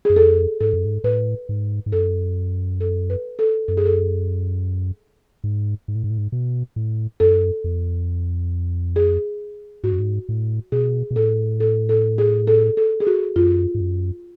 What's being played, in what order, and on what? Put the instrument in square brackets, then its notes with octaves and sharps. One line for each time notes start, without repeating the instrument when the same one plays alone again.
[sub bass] F#2 [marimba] G#4
[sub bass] F2 [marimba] A4
[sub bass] G#2 [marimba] A4
[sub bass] F#2
G#2
[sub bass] A2 [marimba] B4
[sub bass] G#2
G#2
[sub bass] F#2 [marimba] A4
[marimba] A4
B4
A4
[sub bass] F#2 [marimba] A4
[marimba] G#4
A4
[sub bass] G#2
G#2
A2
G#2
A2
G#2
B2
A2
[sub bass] F#2 [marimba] A4
[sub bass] F2
[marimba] G#4
[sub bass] G#2 [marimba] F#4
[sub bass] F#2
G#2
A2
[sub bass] B2 [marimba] G#4
[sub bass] B2
[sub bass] A2 [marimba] A4
[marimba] A4
A4
G#4
A4
A4
G#4
F#4
[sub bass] F#2 [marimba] F4
[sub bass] G#2
F#2